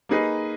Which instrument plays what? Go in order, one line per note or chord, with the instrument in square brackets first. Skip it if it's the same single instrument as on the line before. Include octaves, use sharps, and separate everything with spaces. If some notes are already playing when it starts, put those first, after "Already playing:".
[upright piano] A#3 D#4 G#4 B4 D#5